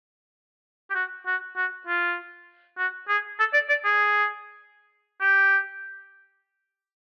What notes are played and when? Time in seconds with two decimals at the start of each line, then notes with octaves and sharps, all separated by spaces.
0.90 G4
0.95 F#4
1.26 F#4
1.56 F#4
1.87 F4
2.78 F#4
3.08 G#4
3.39 A4
3.54 D5
3.69 D5
3.85 G#4
5.21 G4